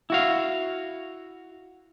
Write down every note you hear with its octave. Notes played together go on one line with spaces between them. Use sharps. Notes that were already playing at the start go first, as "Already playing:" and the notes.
E4 F#4 F5